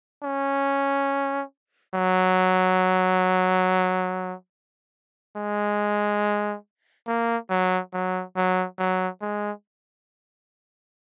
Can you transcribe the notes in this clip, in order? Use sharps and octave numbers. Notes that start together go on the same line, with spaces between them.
C#4
F#3
G#3
A#3
F#3
F#3
F#3
F#3
G#3